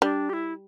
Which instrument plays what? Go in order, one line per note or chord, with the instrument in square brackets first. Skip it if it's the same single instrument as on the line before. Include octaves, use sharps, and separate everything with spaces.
[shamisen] G3 [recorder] D4
[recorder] G4
E4